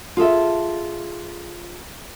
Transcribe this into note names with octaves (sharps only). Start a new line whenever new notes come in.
F4 G#4 A4 E5